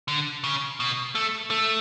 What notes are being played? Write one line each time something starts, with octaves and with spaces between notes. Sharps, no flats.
D3
C#3
B2
A3
A3